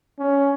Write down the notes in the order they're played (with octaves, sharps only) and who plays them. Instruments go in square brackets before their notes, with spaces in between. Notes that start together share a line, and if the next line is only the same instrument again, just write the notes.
[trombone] C#4